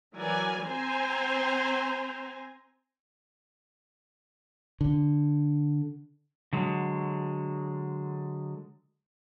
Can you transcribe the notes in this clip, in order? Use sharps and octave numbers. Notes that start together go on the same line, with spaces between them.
E3 F#3 A#4 D5 G#5
C4 C5 G#5 A#5 C6
D3
D3 F#3 G#3